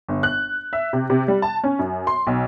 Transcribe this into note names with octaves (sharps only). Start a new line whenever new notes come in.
G1
F#6
E5
C3
C3
G3
A5
C#4
F#2
C6
B1